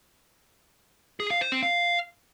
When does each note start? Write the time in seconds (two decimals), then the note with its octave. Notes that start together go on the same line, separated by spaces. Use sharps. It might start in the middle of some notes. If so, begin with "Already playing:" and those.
1.20 G#4
1.30 F5
1.41 C5
1.52 C4
1.63 F5